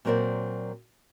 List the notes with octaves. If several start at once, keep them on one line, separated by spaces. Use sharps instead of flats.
A#2 F#3 C4 A#4 C5 D5